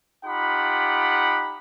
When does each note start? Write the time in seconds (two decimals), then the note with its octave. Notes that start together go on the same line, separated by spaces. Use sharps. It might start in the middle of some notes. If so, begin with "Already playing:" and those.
0.25 D#4 F4 G4 F#5 B5